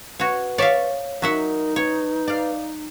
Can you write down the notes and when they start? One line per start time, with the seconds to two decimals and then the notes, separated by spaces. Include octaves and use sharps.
0.19 F#4 B4 C#5
0.58 C#5 D5 E5 F5
1.22 F#3 D#4 A#4 E5 F#5
1.76 B4 C#5
2.28 D5 F5